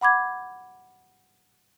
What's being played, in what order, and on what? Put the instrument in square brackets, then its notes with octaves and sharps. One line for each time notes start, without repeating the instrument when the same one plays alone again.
[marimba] F#5 B5 D6 G#6